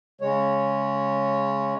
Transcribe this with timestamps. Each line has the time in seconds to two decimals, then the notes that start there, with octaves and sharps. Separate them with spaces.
0.21 C#3 G#3 C#5